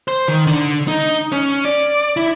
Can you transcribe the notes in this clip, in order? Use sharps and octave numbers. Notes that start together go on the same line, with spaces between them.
C5
D#3
D3
D#4
C#4
D5
E4